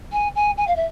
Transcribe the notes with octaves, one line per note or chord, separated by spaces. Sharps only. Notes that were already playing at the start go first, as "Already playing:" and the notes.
G#5
G#5
G#5
F5
E5